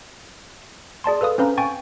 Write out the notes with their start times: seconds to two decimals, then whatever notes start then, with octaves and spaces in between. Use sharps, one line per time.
1.04 G#4 D5 A5 C6
1.21 A4 B4 F5 D#6
1.38 C4 C#4 B4 F5 A#5
1.57 G5 G#5 C#6 A6